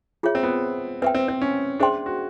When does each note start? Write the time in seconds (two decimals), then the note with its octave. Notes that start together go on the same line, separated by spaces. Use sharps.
0.23 F4 G#4 C#5 E5
0.35 C4
0.43 B3
1.02 C4 B4 E5 G5
1.15 C4
1.28 C4
1.41 C#4
1.80 D4 G#4 C5 E5 G5 C6
2.06 F#4